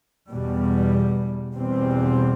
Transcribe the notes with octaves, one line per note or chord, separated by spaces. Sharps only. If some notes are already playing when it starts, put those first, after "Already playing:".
E2 B2 G3
E2 B2 G3 C4